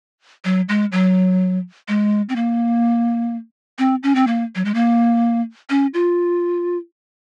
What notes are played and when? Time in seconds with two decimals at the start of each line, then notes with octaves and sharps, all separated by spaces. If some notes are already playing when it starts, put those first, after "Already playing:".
0.45 F#3
0.69 G#3
0.92 F#3
1.88 G#3
2.29 C4
2.36 A#3
3.79 C4
4.03 C#4
4.15 C4
4.27 A#3
4.55 F#3
4.65 G#3
4.74 A#3
5.70 C#4
5.94 F4